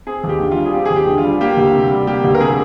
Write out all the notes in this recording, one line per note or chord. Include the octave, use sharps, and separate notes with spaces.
C4 G#4
D#2
G4
D3
F4
G3
G#4
C4 G4
G#4
D#2
G4
D3
F4
G3
A#3 G4
D2
C3
G3
A#3 G4
D2
A#4
C3 G#4